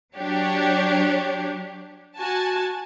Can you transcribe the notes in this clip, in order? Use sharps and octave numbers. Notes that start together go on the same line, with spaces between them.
F#3 D4 G4 C#5
F#4 G#5 A5